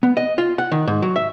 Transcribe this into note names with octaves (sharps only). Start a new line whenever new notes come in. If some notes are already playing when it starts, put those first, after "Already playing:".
B3
D#5
F4
F#5
D#3
G#2
F#3
E5